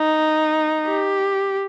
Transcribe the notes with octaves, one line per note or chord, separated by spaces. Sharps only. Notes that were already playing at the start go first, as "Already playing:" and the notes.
Already playing: D#4
G4